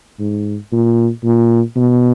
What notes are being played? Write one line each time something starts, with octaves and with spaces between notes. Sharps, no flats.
G#2
A#2
A#2
B2